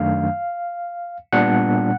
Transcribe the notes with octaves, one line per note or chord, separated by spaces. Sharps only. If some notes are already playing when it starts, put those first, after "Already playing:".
Already playing: F#2 D#3 F#3 A3 D4 F5
A#2 G3 B3 D4 F#5